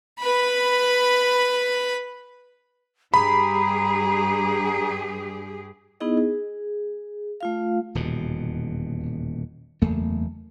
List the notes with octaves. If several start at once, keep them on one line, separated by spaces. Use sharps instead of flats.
B4 B5
G2 G4 G#4 A#5 B5
B3 D#4 E4 G#4 D#5
G#4
A3 F4 F5
D#1 E2 B2
F#1 E2 A3 A#3